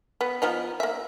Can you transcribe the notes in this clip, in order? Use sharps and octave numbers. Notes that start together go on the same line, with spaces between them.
B3
F3 B3 D#4
A#3 E5